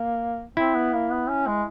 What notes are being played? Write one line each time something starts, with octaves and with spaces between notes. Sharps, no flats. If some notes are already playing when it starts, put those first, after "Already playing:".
Already playing: A#3
C4 E4
B3
A#3
B3
C#4
G#3